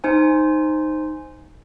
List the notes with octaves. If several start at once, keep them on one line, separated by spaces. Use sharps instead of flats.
D#4 C5 G#5